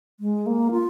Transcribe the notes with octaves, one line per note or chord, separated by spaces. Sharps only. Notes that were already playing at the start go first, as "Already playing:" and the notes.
G#3
A#3
F4